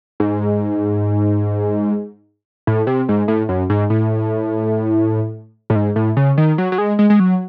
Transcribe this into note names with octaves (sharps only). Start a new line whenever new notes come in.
G#2
A2
C3
G#2
A2
F#2
G#2
A2
A2
G#2
A2
C#3
D#3
F#3
F#3
G#3
G#3
G#3
F#3